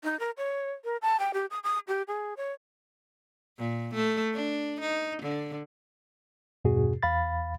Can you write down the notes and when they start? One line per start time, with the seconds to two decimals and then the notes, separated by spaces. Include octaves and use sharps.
0.04 D#4
0.19 A#4
0.37 C#5
0.85 A#4
1.02 A5
1.19 G5
1.34 G4
1.50 D#6
1.64 D#6
1.88 G4
2.08 G#4
2.37 C#5
3.58 A#2
3.94 A3
4.34 D4
4.80 D#4
5.22 D3
6.65 E2 G2 B2 F#4 G#4
7.03 E2 F5 B5 A6